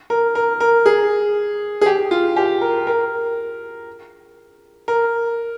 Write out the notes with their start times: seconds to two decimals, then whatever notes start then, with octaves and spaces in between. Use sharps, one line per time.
0.10 A#4
0.35 A#4
0.60 A#4
0.86 G#4
1.81 G#4
1.86 G4
2.11 F4
2.37 G4
2.61 A#4
2.87 A#4
4.88 A#4